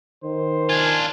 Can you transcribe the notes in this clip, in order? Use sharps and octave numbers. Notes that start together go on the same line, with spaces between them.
D#3 C5
D4 F4 G#5